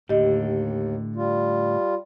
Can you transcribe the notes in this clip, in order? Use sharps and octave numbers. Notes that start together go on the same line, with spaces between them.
D#2 A2 D3 G4 D#5
G3 F4